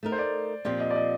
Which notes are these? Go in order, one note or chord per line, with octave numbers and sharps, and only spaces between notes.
A3 D#4 A#4
C5
D5
A#2 F3 C4 G4 D5
D#5
D5
D#5